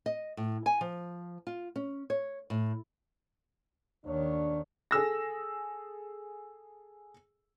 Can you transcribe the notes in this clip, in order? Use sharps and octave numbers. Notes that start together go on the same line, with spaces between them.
D#5
A2
G#5
F3
F4
C#4
C#5
A2
D#2 D#3 D4 C#5
G#4 A4 E6 A#6